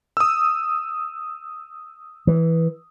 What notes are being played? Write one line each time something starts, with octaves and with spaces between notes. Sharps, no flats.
D#6 E6
E3